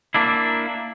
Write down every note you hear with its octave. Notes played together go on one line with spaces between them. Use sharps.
A#3 D4 E4